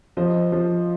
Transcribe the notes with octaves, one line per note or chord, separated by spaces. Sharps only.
F3 C5 D#5
F3